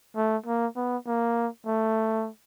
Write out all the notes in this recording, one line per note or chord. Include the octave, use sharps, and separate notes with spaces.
A3
A#3
B3
A#3
A3